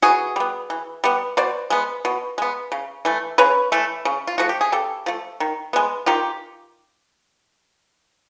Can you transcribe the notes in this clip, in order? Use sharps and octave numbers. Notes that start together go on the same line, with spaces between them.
E3 F#4 G#4
G3 B3
E3
G3 B3
B2 C5 D5
G#3 B3
B2
G#3 B3
C#3
E3 A3
C#3 B4 C#5
E3 A3
C#3
F4
F3 A3 F#4
G4
G#4
C#3 G4 A4
F3 A3
D#3
G#3 B3
D#3 F4 G4